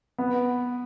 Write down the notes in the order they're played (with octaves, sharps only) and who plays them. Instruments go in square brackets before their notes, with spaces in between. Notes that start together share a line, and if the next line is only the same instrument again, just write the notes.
[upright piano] B3